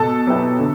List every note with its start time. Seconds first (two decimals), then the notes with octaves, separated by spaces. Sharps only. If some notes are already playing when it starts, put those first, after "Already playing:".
Already playing: B2 A4 A5
0.27 F#3 B3 E4 G4
0.59 D3